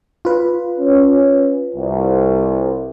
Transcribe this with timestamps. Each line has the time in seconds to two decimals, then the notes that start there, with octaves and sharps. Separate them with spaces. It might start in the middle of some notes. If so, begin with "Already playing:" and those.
0.25 F4 B4
0.79 C#4
1.76 C2